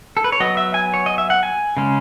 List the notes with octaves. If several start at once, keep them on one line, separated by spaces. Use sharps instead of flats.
A4
B4
C#5
F#3 B3 D#5
E5
G#5
C#5
D#5
E5
F#5
G#5
C#3 G#3 C#4